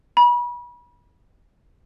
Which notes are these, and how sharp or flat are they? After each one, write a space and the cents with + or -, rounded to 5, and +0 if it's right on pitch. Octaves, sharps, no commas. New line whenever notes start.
B5 -35